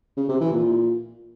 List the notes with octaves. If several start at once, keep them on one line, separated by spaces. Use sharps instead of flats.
C#3
C3
E3
A#2